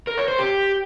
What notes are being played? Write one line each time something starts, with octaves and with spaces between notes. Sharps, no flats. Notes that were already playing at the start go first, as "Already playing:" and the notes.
A#4
C#5
C5
G4